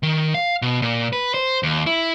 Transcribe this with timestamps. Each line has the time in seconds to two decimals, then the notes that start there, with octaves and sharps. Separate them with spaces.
0.03 D#3
0.34 F5
0.62 B2
0.82 A#2
1.13 B4
1.34 C5
1.63 D#2
1.86 E4